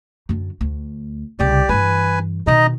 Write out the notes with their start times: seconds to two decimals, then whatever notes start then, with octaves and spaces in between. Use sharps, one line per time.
0.29 F#2 D3
0.61 D2
1.40 C2 C#3 G4 D5
1.69 G2 E3 B4 G#5
2.47 B2 D#3 D#4 D#5 A#5